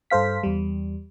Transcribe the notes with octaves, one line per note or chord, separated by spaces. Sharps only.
G2 A4 C5 F5 B6
E2 G3